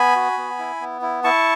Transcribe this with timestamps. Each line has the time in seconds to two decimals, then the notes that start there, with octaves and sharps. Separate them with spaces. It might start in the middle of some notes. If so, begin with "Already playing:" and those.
Already playing: B3 G#5 B5
0.16 F#4
0.37 B3
0.59 E4
0.81 B3
1.02 E4
1.24 E4 A5 C#6